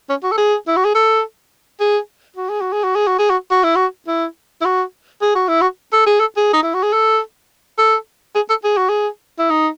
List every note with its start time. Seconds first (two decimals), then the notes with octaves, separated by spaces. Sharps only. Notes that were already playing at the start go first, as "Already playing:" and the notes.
0.10 C#4
0.24 F#4
0.32 A4
0.38 G#4
0.68 E4
0.77 F#4
0.85 G#4
0.95 A4
1.81 G#4
2.37 F#4
2.49 G#4
2.61 F#4
2.73 G#4
2.84 F#4
2.96 G#4
3.08 F#4
3.19 G#4
3.30 F#4
3.51 F#4
3.64 E4
3.76 F#4
4.08 E4
4.61 E4
4.65 F#4
5.22 G#4
5.36 F#4
5.48 E4
5.62 F#4
5.93 A4
6.07 G#4
6.20 A4
6.37 G#4
6.53 D#4
6.63 E4
6.74 F#4
6.84 G#4
6.93 A4
7.78 A4
8.35 G#4
8.50 A4
8.64 G#4
8.78 F#4
8.89 G#4
9.39 E4
9.51 D#4